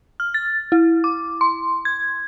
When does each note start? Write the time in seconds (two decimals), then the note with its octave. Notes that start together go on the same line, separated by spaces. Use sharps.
0.20 F6
0.34 A6
0.72 E4
1.04 D6
1.41 C6
1.85 G#6